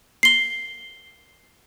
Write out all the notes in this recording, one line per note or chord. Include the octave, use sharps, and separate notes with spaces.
C7 G7